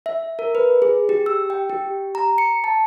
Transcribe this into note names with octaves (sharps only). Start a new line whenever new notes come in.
E5
A#4
B4
G#4
G4
E6
G5
G4
A#5
C#7
A5